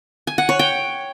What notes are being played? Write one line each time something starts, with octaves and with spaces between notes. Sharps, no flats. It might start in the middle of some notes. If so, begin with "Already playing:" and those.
G#5
F#5
C#5
G5